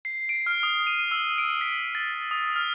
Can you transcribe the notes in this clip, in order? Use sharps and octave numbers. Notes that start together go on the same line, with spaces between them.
C7
D7
F6
D#6
D#7
E6
D7
B6
A6
D#6
F6